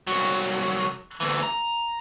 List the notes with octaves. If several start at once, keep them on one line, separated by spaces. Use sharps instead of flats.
C2 F#3
D2 E3
A#5